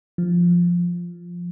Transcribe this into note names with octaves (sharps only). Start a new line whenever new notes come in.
F3